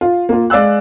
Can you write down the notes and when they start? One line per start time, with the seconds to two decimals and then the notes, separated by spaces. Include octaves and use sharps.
0.01 F4
0.29 A#3 F4
0.50 G#3 D5 F5 E6 F#6